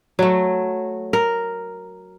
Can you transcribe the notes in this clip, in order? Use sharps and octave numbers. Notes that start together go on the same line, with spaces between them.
F#3 A3
A#4